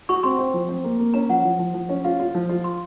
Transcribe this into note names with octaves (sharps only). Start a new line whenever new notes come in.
F#4 C#6
C4 C6
C4
F3
C4
A#3
A#3
C#4 A#5
F3 F#5
F3
F3
F3
C#4
F4 F5
F4
F3
F4
C6